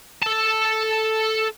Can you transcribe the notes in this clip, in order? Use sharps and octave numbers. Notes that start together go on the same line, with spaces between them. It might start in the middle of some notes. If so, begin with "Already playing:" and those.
A4 A5